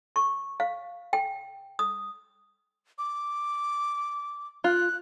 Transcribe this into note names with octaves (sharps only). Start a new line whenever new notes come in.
C#6
F5
G5
D#6
D6
F4 F#6